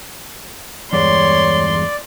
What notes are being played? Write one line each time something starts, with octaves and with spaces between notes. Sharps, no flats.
E2 G2 G#3 C#5 D5 C6